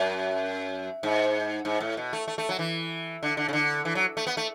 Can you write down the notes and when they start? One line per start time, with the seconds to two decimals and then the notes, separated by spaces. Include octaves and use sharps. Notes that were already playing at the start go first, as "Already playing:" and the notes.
Already playing: F#2
1.03 G#2
1.65 G#2
1.80 A2
1.97 B2
2.13 A3
2.28 A3
2.38 A3
2.49 F#3
2.59 E3
3.23 D3
3.37 D3
3.48 C#3
3.53 D3
3.85 E3
3.95 F#3
4.17 A3
4.27 B3
4.37 A3